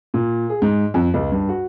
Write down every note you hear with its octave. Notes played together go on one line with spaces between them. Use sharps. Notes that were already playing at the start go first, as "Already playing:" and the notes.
A#2
G#4
G#2
F2
C#2
G2
F#4